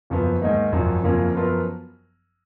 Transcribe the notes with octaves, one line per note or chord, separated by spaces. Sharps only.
F#1 F#2 F3 B3
G#2 D#3 A#3 D#4
G#1 F#2 F3
F#1 F2 F3 A#3 C#4
F#2 F3 B3 F4 A#4